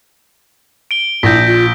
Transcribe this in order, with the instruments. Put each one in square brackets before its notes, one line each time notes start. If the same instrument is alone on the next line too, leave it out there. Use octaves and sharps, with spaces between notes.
[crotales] D7 G7
[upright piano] A#1 [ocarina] E4 [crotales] G6 A#6 B6
[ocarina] F4